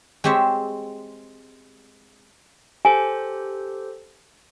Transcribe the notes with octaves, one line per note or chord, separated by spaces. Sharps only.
G#3 C4 G4 C#5 E5
G4 A4 C5 G#5